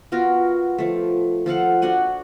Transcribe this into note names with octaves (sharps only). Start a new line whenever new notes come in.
B3 F4 F#4 A#4
F3 A3
F3 A4 F5 F#5
D4 F#4 F#5 G#5